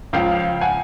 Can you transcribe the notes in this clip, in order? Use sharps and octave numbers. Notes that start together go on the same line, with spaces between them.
C#2 C#3 F3 F5 G5
F#5 G#5